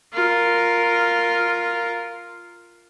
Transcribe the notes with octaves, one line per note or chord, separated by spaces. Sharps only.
F4 A#4